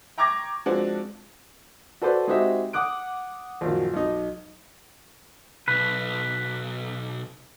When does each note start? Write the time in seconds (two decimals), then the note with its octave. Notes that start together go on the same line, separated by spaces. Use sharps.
0.18 G5 A#5 C#6 D6 G#6 A#6
0.66 F3 G#3 C4 D4 F#4
2.02 F#4 A4 B4 C5 D5
2.27 G#3 C4 D#4 F#4 G4 E5
2.73 F#5 D6 D#6 F#6 D7
3.61 A#1 F#2 D#3 F#3
3.94 B1 D#4
5.68 B1 B4